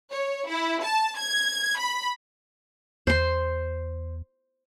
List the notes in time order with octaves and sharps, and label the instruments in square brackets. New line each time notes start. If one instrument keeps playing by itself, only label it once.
[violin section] C#5
E4
A5
G#6
B5
[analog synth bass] E2 [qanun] C5 C6